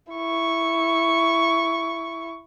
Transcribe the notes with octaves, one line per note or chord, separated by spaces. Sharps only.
E4 C#6